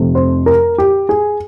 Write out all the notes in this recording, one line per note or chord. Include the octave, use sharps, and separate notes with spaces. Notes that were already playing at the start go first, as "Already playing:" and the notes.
Already playing: F1 F2 C3
C5
A#4
G4
G#4